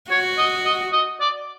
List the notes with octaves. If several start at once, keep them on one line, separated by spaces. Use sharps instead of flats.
F#4 C#5
D#5
D#5
D#5
D5